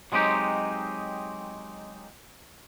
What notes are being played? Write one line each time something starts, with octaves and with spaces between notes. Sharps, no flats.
F#3 G#3 C4 D#4 G4